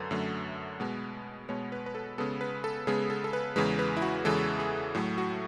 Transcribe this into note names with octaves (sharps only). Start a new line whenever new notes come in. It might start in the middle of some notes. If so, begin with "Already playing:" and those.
Already playing: F#2 D3 F#3 A3 B4
F#2 D3 F#3 A3
B2 G#3 B3
B2 G#3 B3 C#5
B4
B4
A4
C#3 G#3 B3 A4
B4
A4
C#3 G#3 B3 G#4
A4
A4
B4
E2 C#3 E3 G#3 B4
B4
E4
F#4
E2 C#3 E3 G#3 A4
G#4
A2 F#3 A3
F#4